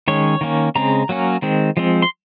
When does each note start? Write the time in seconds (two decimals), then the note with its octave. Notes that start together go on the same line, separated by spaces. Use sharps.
0.08 D#3 G#3 C#4 C#5
0.41 D#3 A#3 C#4
0.75 C#3 G#3 C4 A#5
1.09 F#3 A#3 C#4
1.42 D#3 G#3 C4
1.77 F3 G#3 C4
2.02 C6